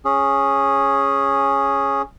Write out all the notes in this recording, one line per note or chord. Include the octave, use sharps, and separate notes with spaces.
C#4 G#4